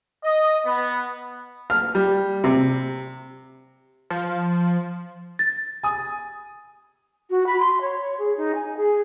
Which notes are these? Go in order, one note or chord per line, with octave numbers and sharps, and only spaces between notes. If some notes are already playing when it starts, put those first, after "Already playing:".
D#5
B3
F6
G3
C3
F3
A6
G#5 D#6
F#4
B5
C6
C#5
C#5
G#4
D#4
G#5
G#4